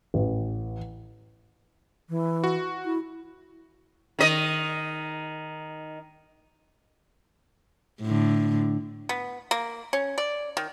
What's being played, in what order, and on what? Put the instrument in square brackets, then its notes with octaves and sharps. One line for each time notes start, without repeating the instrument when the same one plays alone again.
[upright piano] A1
[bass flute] E3
[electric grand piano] F#4
[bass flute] E4
[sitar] D#3 D#5
[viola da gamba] A2 D3
[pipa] B3
A#3
C#4
D5
D#3